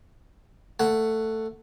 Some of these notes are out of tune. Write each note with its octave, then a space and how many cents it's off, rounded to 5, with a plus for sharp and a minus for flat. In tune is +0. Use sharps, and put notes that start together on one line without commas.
A3 +10 F#5 +0